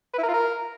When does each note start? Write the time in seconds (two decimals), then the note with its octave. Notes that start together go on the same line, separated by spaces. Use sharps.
0.13 B4
0.18 E4
0.23 A#4
0.28 F4
0.33 A#4